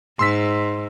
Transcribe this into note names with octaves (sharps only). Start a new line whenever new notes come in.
G#2 C6 E6 B6